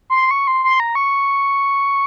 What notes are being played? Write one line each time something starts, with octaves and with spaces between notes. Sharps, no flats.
C6
C#6
C6
C6
A#5
C#6